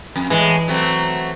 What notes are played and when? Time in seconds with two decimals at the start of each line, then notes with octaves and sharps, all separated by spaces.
0.16 F2
0.30 A2 E3 G#3
0.68 F#3 A3 C4